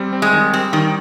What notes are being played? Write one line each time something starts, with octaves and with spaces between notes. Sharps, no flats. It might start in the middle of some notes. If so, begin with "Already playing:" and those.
Already playing: G3 C4
C4
G#3
D#3
G3 C4
D#3 G3